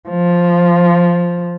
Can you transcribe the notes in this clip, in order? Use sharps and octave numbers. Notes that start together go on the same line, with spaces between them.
F3